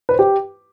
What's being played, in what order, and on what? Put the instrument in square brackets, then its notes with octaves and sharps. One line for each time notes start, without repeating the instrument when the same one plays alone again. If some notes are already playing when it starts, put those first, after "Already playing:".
[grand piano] B4
C5
G4